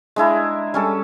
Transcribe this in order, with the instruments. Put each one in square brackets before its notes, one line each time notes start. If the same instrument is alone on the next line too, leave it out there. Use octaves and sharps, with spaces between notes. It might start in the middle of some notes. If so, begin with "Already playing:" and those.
[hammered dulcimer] G#3 D4 E4 A#5
G3 C#4 A4